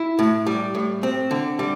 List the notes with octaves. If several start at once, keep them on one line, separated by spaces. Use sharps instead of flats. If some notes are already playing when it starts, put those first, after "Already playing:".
Already playing: E4
A2
G3
A2
C4
D3
G3